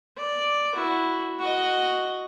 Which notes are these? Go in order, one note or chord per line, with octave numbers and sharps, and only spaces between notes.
D5
E4 F#4
F#4 D#5